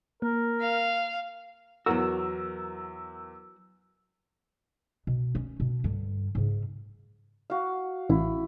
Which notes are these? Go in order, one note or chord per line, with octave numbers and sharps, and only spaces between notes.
A#3 A#4
F5
E2 F#3 F#4 A#4 E6
B2
C#4
B2
G2 D3
G#2 C#3
F#4 F5
A1 E4